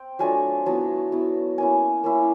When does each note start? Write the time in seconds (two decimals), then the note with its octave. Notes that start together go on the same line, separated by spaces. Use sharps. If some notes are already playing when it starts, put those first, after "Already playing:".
Already playing: C4 G5
0.19 F#3 A3 D4 F4 G#5
0.66 F#3 B3 E4 A5
1.12 F#3 B3 E4
1.58 A#3 C#4 E4 G#5
2.04 A#3 C#4 E4